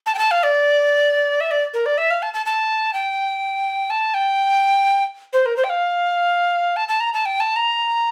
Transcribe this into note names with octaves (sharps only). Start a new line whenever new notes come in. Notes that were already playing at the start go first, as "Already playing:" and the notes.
A5
G5
A5
F5
D5
E5
D5
A#4
D5
E5
F5
A5
A5
A5
G5
A5
G5
C5
A#4
C5
G5
F5
A5
A5
A#5
A5
G5
A5
A#5